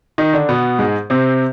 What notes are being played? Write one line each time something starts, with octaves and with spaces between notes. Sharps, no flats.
D#3 D#4
D3 D4
B2 B3
G#2 G#3
C3 C4